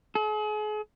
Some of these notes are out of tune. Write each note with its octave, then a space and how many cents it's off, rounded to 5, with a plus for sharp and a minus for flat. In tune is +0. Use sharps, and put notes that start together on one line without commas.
G#4 +40